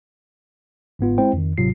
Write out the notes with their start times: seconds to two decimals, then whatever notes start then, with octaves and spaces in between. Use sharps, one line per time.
0.99 G1 G#2 B3 F4
1.18 G#3 C4 E4 C5 G5
1.33 F2 D#3
1.58 G1 G#2 C3 F#3 F4 C7